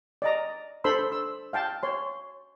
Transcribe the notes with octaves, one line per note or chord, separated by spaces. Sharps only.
D5 D#5 A#5
D4 A4 C5 B5 C6 E6
E6
F5 G5 A5
C#5 C6